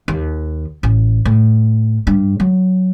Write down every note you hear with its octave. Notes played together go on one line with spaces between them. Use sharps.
D#2
A1
A2
G2
F#3